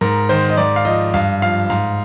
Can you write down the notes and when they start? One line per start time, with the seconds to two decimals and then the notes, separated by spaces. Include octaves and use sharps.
0.01 G#2 A#4
0.29 D#3 C5
0.49 D#5
0.57 G#2 D5
0.76 F5
0.85 F3 D#5
1.14 G2 F5
1.42 F3 F5
1.70 G#2 F5